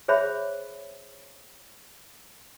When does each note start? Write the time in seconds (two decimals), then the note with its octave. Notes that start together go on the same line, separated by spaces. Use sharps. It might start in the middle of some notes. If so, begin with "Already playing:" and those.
0.08 G#4 C5 C#5 E5 B5